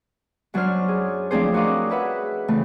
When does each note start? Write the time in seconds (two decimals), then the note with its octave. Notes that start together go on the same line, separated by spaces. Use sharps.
0.54 F#2 F#3 D4 C5 F6
0.88 G#4
1.31 F3 A3 C4 D4 G#4 C5
1.54 F#4 A#4 C#5 D#5 F5 D6
1.90 G#4 B4 E5 F#5
2.48 C#3 E3 A3 C4